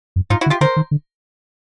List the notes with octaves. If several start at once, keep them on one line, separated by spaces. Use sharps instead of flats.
F#2
G#2 D#4 F4
E4 F#4
D3
F4 G4
D3 A#4 C5
D#3
D3